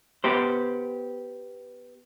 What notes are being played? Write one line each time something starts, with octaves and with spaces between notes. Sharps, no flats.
B3 G4 C5